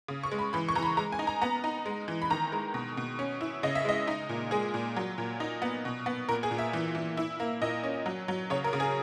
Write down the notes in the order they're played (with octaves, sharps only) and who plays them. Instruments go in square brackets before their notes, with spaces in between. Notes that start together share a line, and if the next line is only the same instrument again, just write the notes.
[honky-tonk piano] C#3
C#6
G#3
B5
E3 B5
C#6
E3 A#5
B5
G#3 A#5
G#5
D#4
A#5
B3 A#5
D#4
G#3
E3
B5
D#3 A#5
G#3
B2
B2
C#4
E4
C#3 D#5
E5
G#3 D#5
D#4
A#2
G#3 G#4
A#2
F#3
A#2
D#4
B3
B2
B3
A#2 A#4
G#4
A#2
E5
E3
E3
E4
A#3
A#2 D#5
C#4
F#3
F#3
C#3 C#5
A#4
C#3
G#4